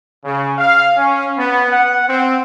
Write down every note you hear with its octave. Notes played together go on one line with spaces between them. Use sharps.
C#3
F5
C#4
B3
F#5
C4